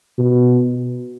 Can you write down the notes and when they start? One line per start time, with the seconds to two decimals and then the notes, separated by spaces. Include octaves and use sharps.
0.19 B2